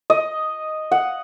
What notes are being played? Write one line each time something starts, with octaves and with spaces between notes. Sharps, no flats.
D#5
F#5